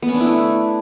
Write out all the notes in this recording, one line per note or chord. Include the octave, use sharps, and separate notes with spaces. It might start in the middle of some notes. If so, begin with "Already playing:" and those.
B3
C#4
D4
E4
A3